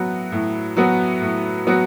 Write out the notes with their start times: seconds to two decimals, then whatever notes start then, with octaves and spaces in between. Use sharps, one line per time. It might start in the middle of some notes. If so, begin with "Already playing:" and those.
Already playing: A2 F#3 B3 F#4
0.32 A2
0.77 F#3 B3 F#4
1.22 A2
1.67 F#3 B3 F#4